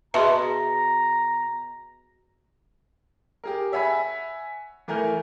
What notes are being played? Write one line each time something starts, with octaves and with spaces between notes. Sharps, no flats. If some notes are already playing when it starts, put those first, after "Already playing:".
B2 F#4 G#4 E5 A5 A#5 C6
G4 G#4 A#4
C#5 E5 F#5 G#5 B5 B6
E3 A3 A#4 G#5 F6 G6